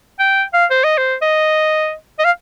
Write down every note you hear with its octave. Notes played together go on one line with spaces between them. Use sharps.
G5
F5
C5
D#5
C5
D#5
D#5
F5